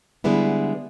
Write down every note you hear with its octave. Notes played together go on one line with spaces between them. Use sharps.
D3 G3 G#3 B3 E4